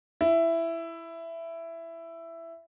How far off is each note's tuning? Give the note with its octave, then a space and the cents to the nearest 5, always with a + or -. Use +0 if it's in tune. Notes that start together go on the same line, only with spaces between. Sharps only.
E4 +10